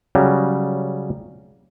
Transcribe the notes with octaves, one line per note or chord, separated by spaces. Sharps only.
C#3 F#3 G3